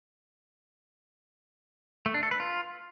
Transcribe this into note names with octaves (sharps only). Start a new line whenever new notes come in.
A3
D4
A4
B4
F4